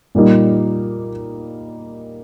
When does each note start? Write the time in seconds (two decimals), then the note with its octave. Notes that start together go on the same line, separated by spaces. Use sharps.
0.15 A#2 G3 A#3 D#4